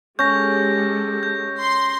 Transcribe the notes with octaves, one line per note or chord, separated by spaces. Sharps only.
G#3 C#4 G4 A4 G6 A#6
G6
C6